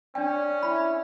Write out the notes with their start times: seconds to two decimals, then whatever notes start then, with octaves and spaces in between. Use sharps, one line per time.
0.15 C#4 D4 D5 G5
0.63 E4 B5